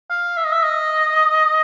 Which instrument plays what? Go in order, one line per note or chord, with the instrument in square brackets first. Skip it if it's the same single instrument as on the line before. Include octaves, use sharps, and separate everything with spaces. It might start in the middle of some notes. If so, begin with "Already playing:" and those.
[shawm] F5
E5
D#5
E5
D#5